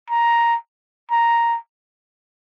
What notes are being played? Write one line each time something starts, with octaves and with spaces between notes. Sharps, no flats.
A#5
A#5